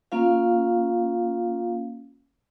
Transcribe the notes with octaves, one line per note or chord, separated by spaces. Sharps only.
A#3 C#4 F4 F5